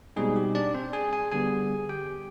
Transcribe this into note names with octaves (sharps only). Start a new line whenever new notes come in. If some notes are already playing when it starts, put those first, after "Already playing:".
B2 G3 G#3 C4 D#4 G#4
G4
D4 D5
C4 C5
G#4 G#5
G#4 G#5
D3 G3 B3 G#4 G#5
G4 G5